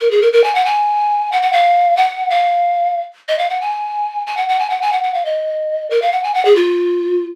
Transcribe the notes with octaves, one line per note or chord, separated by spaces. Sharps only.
A#4
G#4
A#4
A#4
G#5
F#5
G#5
F#5
F#5
F5
F#5
F5
D#5
F5
F#5
G#5
G#5
F#5
F#5
G#5
F#5
G#5
F#5
F#5
F5
D#5
A#4
F5
F#5
G#5
F#5
G#4
F4